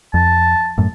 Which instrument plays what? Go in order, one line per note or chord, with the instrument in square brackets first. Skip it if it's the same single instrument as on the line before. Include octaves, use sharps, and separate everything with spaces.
[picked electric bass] F2 [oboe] A5
[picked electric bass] F#2 A2